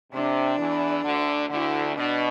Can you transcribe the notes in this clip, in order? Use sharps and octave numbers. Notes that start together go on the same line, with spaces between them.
C3 D4
E2 E3
D2 D3
D2 D3 E4
B2 D4